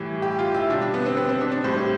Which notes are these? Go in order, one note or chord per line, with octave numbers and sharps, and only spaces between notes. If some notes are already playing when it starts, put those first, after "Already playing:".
Already playing: A2 E3 G3
G4
F4
E4
B2 G3 D4
D4
B3
C4
B3
C4
D4
D4
A2 G3 C5